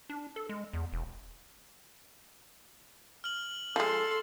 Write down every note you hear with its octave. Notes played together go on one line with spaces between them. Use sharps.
D4
A4
G#3
E2
E1
F6 F#7
F3 G#3 A4 C6